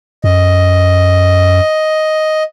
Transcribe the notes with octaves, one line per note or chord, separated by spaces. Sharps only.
F#2 D#5